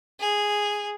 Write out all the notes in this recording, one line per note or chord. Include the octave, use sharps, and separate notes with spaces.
G#4